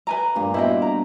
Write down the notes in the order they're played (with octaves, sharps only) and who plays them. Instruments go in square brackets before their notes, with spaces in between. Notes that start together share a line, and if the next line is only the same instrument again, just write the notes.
[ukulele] B4 G#5 A#5
[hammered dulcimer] G2 A#2
[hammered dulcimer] B2 [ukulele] E4 C5 G5
[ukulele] A#5